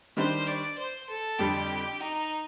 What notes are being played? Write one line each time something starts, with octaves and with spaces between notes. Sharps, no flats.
D#3 G3 D4 G4 C5
D5
C5
A4
F2 D3 G3 G4
D#4